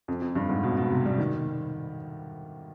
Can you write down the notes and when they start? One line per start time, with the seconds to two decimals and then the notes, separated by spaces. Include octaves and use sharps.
0.08 F2
0.22 F2
0.35 G2
0.49 G#2
0.63 B2
0.77 B2
0.91 C3
1.06 G3
1.18 D#3